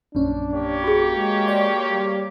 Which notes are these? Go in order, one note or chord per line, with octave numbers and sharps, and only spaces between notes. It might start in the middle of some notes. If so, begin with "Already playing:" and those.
A#1 F#2 C#4 D4
A#3 G4 C#5
F#4 G#4
G#3
D5 G5 C6
G3